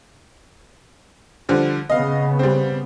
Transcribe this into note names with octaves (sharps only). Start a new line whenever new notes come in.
D3 F3 G3
C#3 B3 D#5 F5
G3 C4